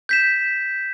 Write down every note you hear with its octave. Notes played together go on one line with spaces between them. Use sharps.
G6 B6 E7